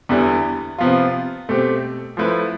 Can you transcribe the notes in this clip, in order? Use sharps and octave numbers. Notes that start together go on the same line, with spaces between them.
E2 D3 G3 B3 E4
C3 F3 B3 F4
B2 A3 C4 G4
F3 A3 E4 B4